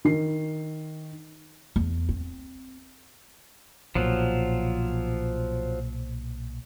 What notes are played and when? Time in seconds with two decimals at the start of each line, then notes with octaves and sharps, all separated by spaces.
0.05 D#3 C7
1.76 E2
2.09 C4
3.95 B1 A#2 F3 F#3